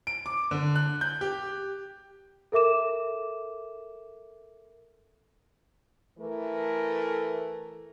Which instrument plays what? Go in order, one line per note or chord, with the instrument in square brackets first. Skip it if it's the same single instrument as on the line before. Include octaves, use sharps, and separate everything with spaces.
[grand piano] D7
D6
D3
F#6
G6
G4
[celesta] A4 A#4 E5 D6 E7
[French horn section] E3 A3 A4 A#4